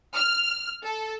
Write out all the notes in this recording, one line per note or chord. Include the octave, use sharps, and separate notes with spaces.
F6
A4